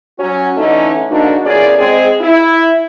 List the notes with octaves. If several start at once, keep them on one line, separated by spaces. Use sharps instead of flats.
F#3 C#4 F#4
D3 E3 A3 C#4 D#4
G#2 D3 A#3 D4 D#4 F#4
E2 A#2 C#4 G#4 D5
G#3 C4 G#4
E4